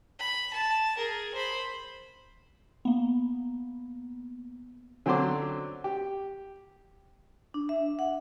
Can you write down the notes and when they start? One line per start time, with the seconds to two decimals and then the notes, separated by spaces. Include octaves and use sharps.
0.19 B5
0.53 A5
0.97 G#4 A#4
1.34 C5 B5
2.85 A#3 B3
5.06 D3 F#3 C4 C#4 C6 D6
5.84 G4
7.54 D4
7.69 E5
7.99 F#5